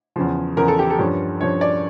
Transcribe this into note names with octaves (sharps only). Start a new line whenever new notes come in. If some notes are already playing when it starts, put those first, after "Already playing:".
E2 C#3 F3
E2 C#3 F3 A#4
A4
G4
A4
G2 F3 C#4
G2 F3 C#4 C#5
D5